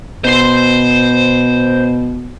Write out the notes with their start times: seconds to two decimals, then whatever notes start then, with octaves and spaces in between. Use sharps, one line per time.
0.24 B2 C5 C6